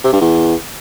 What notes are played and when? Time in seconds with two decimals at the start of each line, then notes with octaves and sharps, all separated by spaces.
0.04 C3
0.13 G2
0.21 E2